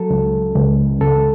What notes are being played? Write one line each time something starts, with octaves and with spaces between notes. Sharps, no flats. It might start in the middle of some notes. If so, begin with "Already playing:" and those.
Already playing: F#3 A4
C#2
C#2
C#2 A4